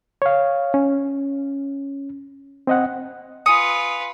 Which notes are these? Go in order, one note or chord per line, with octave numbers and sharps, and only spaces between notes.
C#5 F5
C#4
C4 D#5 F#5
F4 B4 G#5 D#6 C#7